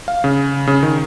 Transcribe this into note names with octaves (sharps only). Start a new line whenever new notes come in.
F5
C#3
C#3
D#3